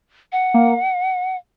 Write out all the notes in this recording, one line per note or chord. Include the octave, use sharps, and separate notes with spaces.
F#5
A#3